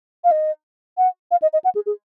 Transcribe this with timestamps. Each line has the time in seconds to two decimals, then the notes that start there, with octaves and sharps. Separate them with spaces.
0.24 F5
0.31 D#5
0.98 F#5
1.31 F5
1.42 D#5
1.53 D#5
1.64 F#5
1.75 G#4
1.86 G#4